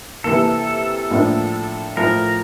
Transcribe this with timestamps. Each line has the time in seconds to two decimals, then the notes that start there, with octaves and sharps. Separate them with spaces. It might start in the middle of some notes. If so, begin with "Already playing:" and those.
0.24 C3 E3 A#3 A4
1.10 A2 F3 A#3 D4
1.97 A2 F3 A3 A#4